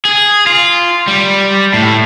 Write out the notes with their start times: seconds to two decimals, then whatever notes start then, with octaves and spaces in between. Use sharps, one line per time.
0.05 G#4
0.47 F4
1.08 G3
1.74 A2